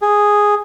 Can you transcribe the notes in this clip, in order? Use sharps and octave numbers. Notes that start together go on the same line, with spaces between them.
G#4